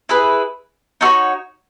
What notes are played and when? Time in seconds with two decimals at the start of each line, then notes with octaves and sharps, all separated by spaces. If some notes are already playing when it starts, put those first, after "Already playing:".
0.09 E4 G#4 B4
1.01 D#4 F#4 A4
1.05 C#5